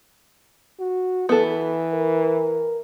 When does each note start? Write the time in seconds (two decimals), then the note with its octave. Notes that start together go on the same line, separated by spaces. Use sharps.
0.79 F#4
1.29 E3 B3 A4
1.94 A#4